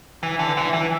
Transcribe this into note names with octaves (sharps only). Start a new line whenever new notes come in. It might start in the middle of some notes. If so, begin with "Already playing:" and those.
E3
D3
E3
E3